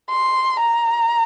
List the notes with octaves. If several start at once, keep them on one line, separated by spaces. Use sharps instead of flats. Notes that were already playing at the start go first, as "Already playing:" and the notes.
C6
A#5